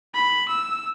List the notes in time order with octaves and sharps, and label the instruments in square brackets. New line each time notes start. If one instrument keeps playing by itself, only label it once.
[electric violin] B5
E6